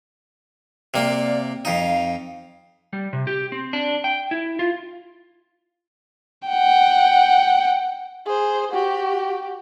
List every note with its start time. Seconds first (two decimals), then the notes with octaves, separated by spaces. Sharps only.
0.94 C3 A#3 D5
1.65 F2 D#4 F5
2.93 G3
3.13 C3
3.27 G4
3.52 C4
3.73 D4
4.04 G5
4.31 E4
4.59 F4
6.48 F#5 G5
8.25 G#4 C5
8.71 F#4 G4